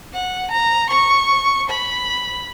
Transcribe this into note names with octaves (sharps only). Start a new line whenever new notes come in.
F#5
A#5
C#6
B5